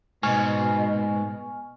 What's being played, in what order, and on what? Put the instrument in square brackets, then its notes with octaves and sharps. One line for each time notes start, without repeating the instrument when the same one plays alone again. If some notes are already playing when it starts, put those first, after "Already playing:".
[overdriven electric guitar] G#2 [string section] B2 [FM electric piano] G#5 C#6 F6